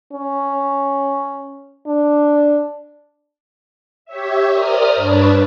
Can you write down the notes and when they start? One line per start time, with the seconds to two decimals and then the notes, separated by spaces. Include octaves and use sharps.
0.13 C#4
1.87 D4
4.05 G4 C#5 E5
4.52 A#4 C5 D5 D#6 F6
4.95 G2 D4 B4 C#5 A5